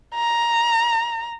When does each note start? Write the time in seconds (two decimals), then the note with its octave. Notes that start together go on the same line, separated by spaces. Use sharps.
0.15 A#5